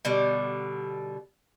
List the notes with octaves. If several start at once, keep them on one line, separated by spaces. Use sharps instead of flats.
B2 D3 G3